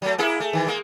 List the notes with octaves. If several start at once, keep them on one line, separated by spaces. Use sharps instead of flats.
F#3 A3
A#3 E4 G#4
A3
D#3 E3
G#3 A#3